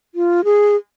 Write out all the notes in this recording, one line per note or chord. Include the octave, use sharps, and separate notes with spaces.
F4
G#4